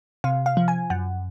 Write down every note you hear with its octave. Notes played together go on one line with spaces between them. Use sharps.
C3 F5
F5
F3
G#5
F#2 F#5